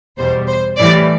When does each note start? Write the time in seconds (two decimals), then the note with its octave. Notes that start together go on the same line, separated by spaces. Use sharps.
0.17 E2 B2 G3 C5
0.48 C5
0.78 A2 E3 G3 D5